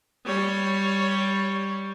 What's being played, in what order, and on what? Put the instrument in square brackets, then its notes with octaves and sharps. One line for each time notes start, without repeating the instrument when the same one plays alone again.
[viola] G3 C#5